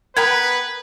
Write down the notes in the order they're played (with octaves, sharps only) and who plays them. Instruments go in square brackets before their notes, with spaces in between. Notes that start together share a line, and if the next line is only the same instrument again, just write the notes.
[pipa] B3 A#4 G5 [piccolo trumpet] B4 [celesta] G#6